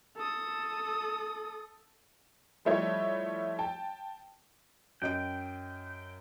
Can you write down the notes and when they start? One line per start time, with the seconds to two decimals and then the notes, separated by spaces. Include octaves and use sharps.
0.17 A4 D#6
2.65 F3 G3 A3 E4 C#5 D#5
3.59 G5 A5
5.02 F#2 D#5 G5 D7